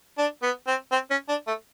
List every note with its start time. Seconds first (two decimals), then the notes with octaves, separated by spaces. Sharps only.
0.18 D4
0.43 B3
0.67 C4
0.92 C4
1.11 C#4
1.29 D4
1.47 A3